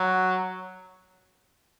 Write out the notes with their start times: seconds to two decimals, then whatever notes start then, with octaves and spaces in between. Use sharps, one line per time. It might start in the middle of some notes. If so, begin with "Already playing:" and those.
Already playing: F#3